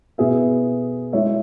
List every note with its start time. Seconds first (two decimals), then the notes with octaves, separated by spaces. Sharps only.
0.18 B2 B3 E4 G#4 E5
1.13 G#3 E4 C#5 E5